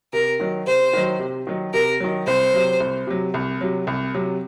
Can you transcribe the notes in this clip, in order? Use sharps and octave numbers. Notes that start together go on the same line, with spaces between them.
C3 A#4
D#3 F#3
C3 C5
D#3 F#3
C3
D#3 F#3
C3 A#4
D#3 F#3
C2 C5
C3 F#3
C2
C3 F#3
C2
C3 F#3
C2
C3 F#3